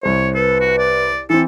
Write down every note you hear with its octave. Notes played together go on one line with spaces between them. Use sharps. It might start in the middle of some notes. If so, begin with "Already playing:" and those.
C2 C5 C#5
A4 B4
F#4
D5
E3 C4 E4 A4